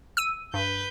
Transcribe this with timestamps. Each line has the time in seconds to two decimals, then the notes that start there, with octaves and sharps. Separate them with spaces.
0.17 E6 D#7
0.54 G2 B4 G6